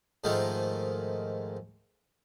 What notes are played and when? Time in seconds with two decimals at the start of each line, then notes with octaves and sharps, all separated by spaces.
0.24 G#2 D#3 F3 G#3 A3